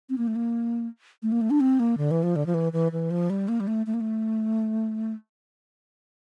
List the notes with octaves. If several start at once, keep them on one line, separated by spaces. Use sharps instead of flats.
C4
A#3
A3
A#3
A3
A#3
A3
D4
C4
A#3
D3
E3
F3
D3
F3
E3
E3
E3
F3
G3
A#3
G3
A3
A3
A#3
A3